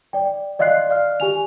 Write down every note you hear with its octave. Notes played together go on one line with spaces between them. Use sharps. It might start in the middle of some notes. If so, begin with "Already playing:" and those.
D5 G5
D5 D#5 F5 C6 F#6 C7
D5 F5 F6
G4 G#5 F7